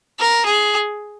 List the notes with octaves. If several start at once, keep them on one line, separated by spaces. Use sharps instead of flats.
A#4
G#4